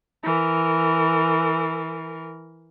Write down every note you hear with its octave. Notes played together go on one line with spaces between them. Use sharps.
E3 A#4